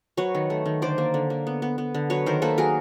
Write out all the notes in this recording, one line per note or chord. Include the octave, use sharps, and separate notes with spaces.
F#3 B4 C#5
D#3
A3
D#3
D3 C5 D5
A#3
D3
A#3
B3
B3
B3
D3
F#3 B4 C#5
D#3 A#4 C5
A#3 A4 B4
F#3 G#4 A#4